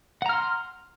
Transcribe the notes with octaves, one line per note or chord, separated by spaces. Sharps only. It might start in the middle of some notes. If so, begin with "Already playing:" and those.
F#5 A#5 C6 F6